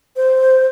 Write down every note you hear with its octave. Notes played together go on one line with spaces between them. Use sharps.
C5